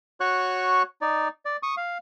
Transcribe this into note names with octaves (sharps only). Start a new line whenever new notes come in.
F#4 C#5 C#6 F#6
D#4 D5
D5
C#6 D#6
F5